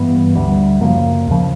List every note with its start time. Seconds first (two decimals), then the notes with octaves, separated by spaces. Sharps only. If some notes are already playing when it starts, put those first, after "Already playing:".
Already playing: G2 E3 G3 B3
0.35 D2 D3 G3
0.81 F#2 C#3 F3 A#3
1.27 D#2 C#3 F3